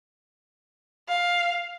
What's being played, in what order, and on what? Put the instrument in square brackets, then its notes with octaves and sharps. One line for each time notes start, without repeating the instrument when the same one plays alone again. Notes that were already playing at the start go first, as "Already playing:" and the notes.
[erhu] F5